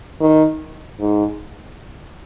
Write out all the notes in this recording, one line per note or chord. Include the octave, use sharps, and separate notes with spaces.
D#3
G#2